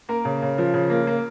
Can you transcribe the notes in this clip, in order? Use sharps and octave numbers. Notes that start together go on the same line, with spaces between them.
A#3 A#4
C#3
C#3
F3
C#3
A#3
A#3